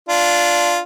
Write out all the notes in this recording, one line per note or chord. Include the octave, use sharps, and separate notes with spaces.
D4 F4